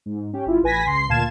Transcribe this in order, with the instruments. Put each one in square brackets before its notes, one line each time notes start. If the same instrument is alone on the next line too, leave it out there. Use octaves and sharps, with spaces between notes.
[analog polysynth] G#2
C#4 G4
G1 E4 F4
A1 B4 G#5 A#6 B6
C#2 C6 C7
D2 A#2 F5 A5 G#6 E7